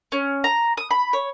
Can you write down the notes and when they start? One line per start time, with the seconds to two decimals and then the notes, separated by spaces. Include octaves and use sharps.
0.12 C#4
0.44 A#5
0.77 D#6
0.90 B5
1.13 C#5